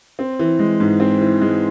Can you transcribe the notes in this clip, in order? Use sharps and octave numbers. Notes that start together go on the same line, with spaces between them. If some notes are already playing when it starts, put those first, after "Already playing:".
C4
E3
G#3
G#2
C4
E3
G#3